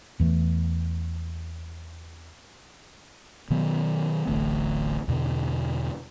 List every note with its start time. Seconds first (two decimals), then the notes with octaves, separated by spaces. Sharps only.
0.20 E2 E3 A3
3.50 B2 D#3 F#3 B3
4.28 D1 A1 D2
5.08 E2 B2 D3